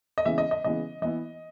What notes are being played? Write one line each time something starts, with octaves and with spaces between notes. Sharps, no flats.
D#5
C#3 E3 G#3 B3 E5
D#5
D#5
C#3 E3 G#3 B3 D#5
E3 B3 E4 D#5